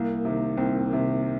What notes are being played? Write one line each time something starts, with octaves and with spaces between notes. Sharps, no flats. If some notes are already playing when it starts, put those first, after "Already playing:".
Already playing: C2 A#3
C3 D#3
C2 C4
C3 D#3